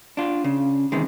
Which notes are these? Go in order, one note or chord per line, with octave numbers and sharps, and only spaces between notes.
D4 F4
C#3
E2 C3 D#3 G#3